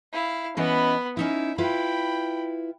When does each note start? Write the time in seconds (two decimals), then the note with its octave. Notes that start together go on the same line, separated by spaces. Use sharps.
0.13 E4 F5
0.57 E3 B3 C#4 D#5 B5
1.17 C#4 D#4 E4 E5
1.58 E4 F4 B4 G5 B5